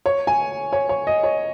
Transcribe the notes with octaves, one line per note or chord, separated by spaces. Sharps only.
C#5
G#5
C#5
C#5
D#5
C#5